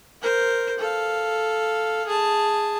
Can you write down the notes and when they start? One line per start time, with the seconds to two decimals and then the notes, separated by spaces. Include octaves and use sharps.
0.22 A#4 C5
0.79 A4 F5
2.07 G#4 A5